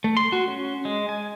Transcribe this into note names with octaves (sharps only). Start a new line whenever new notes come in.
A3
C6
F#4
C#4
G#3
G#5